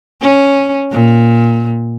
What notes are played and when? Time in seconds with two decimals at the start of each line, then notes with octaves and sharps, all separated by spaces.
0.22 C#4
0.92 A#2